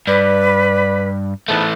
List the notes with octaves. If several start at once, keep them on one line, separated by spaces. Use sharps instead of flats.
G2 B4 D5 B5
G#2 E3 A3 B3 A5